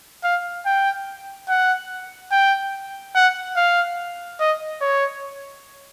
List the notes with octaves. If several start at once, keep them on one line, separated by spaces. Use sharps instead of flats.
F5
G5
F#5
G5
F#5
F5
D#5
C#5